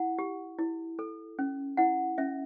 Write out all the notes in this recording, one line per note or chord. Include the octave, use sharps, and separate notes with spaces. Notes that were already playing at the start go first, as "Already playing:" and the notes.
Already playing: E4 F#5
G4
E4
A4
C#4
E4 F#5
C#4 E5